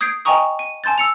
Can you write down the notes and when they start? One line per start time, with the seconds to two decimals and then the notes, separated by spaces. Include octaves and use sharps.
0.01 D#6 G6 G#6 C7 D7
0.25 D#5 G5 G#5 A#5 C#6 D#6
0.59 D#7
0.84 G#5 A5 C6 G6 A6
0.98 E6 C#7 F7